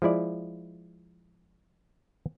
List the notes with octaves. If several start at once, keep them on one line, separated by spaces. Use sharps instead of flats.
F3 G#3 E4 D5